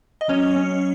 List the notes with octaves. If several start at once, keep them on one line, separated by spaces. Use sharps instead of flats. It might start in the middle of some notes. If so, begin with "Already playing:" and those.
D#5
F#3 C#4 C#5
C#4